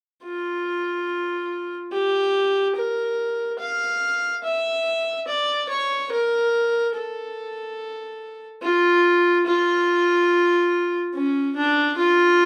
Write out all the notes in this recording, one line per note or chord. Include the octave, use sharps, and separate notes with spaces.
F4
G4
A#4
F5
E5
D5
C#5
A#4
A4
F4
F4
C#4
D4
F4